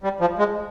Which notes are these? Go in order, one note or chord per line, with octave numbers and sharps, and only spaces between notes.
G3
F3
G#3